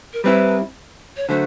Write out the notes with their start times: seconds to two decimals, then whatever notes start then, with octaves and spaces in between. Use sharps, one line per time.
0.13 A#4
0.24 G3 C4 E4 B4
1.17 C#5
1.29 D3 F#3 A3 C5